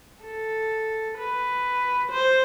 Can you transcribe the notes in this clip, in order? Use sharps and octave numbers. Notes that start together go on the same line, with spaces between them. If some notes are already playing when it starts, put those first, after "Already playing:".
A4
B4
C5